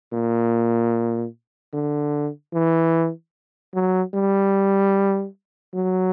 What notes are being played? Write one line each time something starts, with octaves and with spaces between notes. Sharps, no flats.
A#2
D3
E3
F#3
G3
F#3